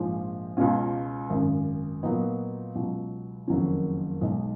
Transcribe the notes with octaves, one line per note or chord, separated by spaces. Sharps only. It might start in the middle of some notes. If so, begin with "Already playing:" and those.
Already playing: A#1 G#2 F3 G#3
C#2 B2 G#3 C#4 F4
G#1 F#2 C#3
A#2 F#3 B3 D#4
C#2 B2 F#3
F#1 F2 D#3 F#3 C#4
B1 B2 G#3 D#4